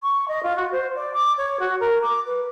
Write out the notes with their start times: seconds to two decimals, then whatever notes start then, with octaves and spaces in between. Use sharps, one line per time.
0.03 C#6
0.28 D#5
0.43 F4
0.56 F#4
0.72 C5
0.95 D5
1.14 D6
1.38 C#5
1.60 F#4
1.80 A#4
2.02 D6
2.26 B4